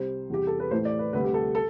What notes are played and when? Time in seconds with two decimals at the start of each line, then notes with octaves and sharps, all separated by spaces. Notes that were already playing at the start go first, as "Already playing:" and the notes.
Already playing: C2 C3 G3 C5
0.30 E2 C3 G3 G4
0.47 A4
0.60 B4
0.71 A2 E3 A3 C5
0.85 D5
0.99 B4
1.13 D2 C3 G3 B4
1.24 G4
1.34 A4
1.55 A4